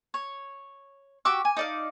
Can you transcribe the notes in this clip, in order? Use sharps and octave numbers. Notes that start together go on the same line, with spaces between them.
C#5
F#4 G4 D6 E6
G#5
D#4 D5 F5